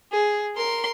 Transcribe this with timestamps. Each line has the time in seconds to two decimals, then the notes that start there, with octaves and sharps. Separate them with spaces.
0.12 G#4
0.56 A#4 C6